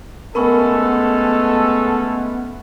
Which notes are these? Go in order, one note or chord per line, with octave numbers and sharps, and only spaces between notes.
G#3 A3 B3 C#4 A4 A#4 B5 C#6